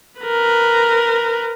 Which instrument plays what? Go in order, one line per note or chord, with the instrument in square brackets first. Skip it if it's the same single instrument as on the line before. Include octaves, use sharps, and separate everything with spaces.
[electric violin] A#4 B4